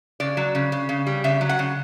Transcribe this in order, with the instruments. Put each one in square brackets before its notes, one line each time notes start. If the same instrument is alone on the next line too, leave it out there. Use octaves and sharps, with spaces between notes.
[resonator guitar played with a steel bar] C#3 D5
F#3
C#3
C#3
C#3
G3
C#3 E5
F#3
F#5
C#3